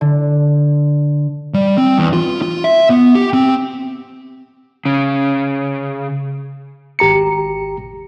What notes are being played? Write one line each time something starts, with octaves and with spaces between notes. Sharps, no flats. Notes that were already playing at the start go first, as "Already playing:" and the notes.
D3
G3
C4
E2
F4
F4
E5
B3
G4
C4
C#3
G#1 G4 A#5 C#7